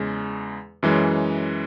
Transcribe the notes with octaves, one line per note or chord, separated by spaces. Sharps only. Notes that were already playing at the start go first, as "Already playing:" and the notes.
Already playing: E2 C#3 G#3
F#2 E3 G#3 C#4